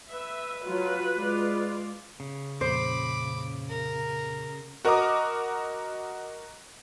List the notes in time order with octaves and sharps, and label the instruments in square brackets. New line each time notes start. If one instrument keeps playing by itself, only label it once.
[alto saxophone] B4 [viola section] E5
[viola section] F#3 F4
G#3 F4 D5
[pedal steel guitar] C#3
[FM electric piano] F2 A#2 [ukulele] C5 [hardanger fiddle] B5 D6
[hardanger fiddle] A#4
[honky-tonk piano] F#4 A#4 D#5 A#5 D6 D#6